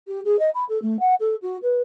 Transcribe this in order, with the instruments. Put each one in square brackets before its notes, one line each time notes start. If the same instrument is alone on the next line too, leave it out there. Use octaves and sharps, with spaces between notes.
[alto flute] G4
G#4
D#5
B5
A4
A3
F#5
A4
F#4
B4